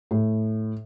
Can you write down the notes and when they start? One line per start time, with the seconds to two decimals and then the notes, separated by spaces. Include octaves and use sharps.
0.11 A2